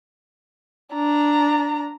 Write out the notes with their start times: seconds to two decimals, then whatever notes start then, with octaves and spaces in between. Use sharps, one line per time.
0.95 D4 A#5